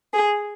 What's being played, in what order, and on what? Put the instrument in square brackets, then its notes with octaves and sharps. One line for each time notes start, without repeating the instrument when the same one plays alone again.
[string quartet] G#4